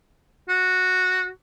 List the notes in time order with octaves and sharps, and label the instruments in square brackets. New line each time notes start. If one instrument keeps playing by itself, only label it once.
[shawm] F#4